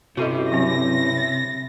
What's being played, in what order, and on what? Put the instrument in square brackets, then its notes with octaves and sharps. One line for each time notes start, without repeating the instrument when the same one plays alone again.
[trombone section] G2 C#4 E4 [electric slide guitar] C3 [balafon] F#4 A4 D#5
[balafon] F#3 C4 [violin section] A#6